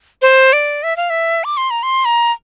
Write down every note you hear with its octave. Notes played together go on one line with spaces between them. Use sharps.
C5
D5
E5
F5
E5
D6
C6
A#5
C6
A#5